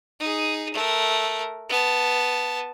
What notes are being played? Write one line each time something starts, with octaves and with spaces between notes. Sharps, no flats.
D#4 G#4
A3 A#4
B3 A5